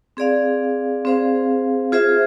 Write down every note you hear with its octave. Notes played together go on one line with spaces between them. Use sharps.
C4 G#4 D5 F5
C4 G#4 C5 F5
F4 G#4 C5 E5